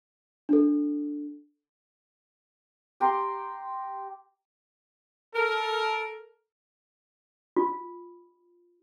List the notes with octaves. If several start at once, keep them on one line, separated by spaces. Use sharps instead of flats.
D4 A4
G4 G5 A#5 C6
A4 A#4
F4